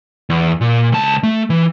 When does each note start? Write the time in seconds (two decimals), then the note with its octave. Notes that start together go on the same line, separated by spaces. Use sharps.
0.30 E2
0.61 A#2
0.92 C#2 A5
1.23 A3
1.50 E3